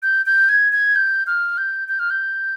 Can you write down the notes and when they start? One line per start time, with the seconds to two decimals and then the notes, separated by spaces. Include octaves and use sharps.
0.03 G6
0.26 G6
0.49 G#6
0.72 G#6
0.95 G6
1.27 F6
1.57 G6
1.88 G6
1.99 F6
2.10 G6